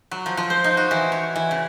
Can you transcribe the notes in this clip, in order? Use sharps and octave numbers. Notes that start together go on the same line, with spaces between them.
F#3
F3
F3
C5
D#4
F#4
E3
C#5
E3
C#3